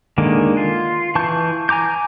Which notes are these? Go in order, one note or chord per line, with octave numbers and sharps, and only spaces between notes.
D3 D#3 G#3 A#3
F4
E3 A5 C#6 G6
G#5 A#5 D6 G6